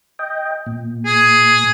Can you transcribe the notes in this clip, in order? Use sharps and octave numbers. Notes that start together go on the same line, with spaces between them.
D#5 G5
A#2
G#4